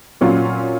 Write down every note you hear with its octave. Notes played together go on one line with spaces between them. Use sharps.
A#2 F#3 C#4 F4